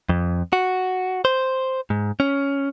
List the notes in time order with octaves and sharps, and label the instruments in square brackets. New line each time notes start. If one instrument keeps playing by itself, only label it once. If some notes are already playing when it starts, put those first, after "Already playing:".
[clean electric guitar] F2
F#4
C5
G#2
C#4